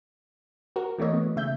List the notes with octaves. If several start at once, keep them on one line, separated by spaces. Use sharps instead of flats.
F#4 A#4
E3 A3 A#3 C#5 D#5
B3
C#3 E5 G6